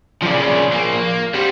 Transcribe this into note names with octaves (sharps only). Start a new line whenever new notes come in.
C2 C#3 F3 D5
A#3
G3 B3 C5